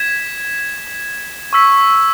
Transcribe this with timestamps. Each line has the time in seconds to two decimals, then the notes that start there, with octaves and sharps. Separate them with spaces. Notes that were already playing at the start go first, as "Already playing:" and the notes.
Already playing: G#6 B6 E7
1.53 C#6 E6 B6